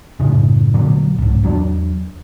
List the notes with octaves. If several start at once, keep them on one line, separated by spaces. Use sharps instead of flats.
F#2 A2 C#3
A#2 D3 F#3
C2 G#2
E2 F#3 C4 D4